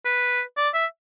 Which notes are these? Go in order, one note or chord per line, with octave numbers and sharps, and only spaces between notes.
B4
D5
E5